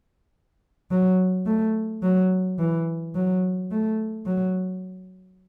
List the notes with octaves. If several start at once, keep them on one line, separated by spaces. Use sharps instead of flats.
F#3
A3
F#3
E3
F#3
A3
F#3